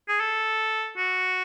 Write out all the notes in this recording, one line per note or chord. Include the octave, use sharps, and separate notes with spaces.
G#4
A4
F#4